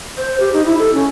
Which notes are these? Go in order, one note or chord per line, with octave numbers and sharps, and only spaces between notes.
C5
G4
D#4
E4
A4
C#4